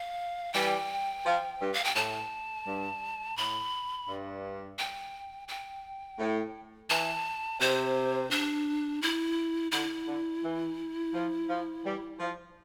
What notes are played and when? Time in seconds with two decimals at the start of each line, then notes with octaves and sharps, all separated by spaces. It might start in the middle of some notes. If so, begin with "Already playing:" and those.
Already playing: F5
0.54 E3 G3 G5
1.25 F3
1.60 G2
1.74 F5
1.85 G5
1.95 A2 A5
2.66 G2
3.37 A2 B5
4.08 G2
4.79 G5
5.48 G5
6.19 A2
6.90 E3 A5
7.60 C3 C5
8.31 D4
9.02 E4
9.72 D3 E4
10.07 D3
10.43 E3
11.14 F3
11.49 F3
11.84 E3 G3
12.20 F3